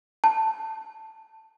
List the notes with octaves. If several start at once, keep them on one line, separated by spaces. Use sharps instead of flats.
A5